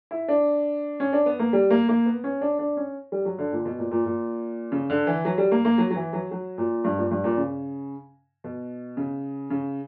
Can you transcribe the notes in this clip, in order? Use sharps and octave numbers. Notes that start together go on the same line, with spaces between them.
E4
D4
C#4
D4
B3
A#3
G3
A#3
A#3
B3
C#4
D4
D4
C#4
G3
F#3
D3
A#2
B2
A#2
A#2
A#2
C#3
D3
E3
F#3
G3
A#3
A#3
F#3
F#3
E3
F#3
F#3
A#2
G2
A#2
G2
A#2
C#3
B2
C#3
C#3